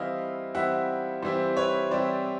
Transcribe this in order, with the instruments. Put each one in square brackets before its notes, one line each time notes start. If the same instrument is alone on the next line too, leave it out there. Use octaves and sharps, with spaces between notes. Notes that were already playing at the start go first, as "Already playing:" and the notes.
Already playing: [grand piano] E3 G3 C4 E4 D#5 F5
E3 G3 C4 E4 E5 F#5
E3 G3 C4 E4 C5
B4 C#5
E3 G3 C4 E4 C5 D5